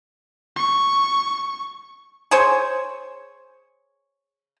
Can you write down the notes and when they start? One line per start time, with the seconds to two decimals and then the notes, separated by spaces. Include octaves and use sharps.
0.56 C#6
2.31 G#4 C5 C#5